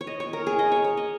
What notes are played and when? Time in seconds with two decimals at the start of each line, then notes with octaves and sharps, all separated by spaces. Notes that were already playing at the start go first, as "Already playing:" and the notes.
0.01 C#5
0.07 D#5
0.20 C#5
0.33 A#4
0.47 G#4
0.59 D#5
0.72 C#5
0.84 C#5
0.97 D#5